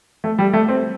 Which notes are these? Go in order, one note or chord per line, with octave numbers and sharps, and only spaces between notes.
A3
G3
A3
C4